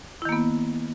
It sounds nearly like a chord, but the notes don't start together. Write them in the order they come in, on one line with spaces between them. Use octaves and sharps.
E4 D#3 A#3 B3